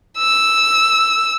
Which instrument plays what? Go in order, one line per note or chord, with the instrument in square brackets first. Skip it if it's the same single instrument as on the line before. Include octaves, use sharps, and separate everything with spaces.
[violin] E6